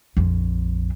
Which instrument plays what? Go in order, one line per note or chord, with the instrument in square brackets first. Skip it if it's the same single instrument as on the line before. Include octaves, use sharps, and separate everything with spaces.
[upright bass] A#1 F2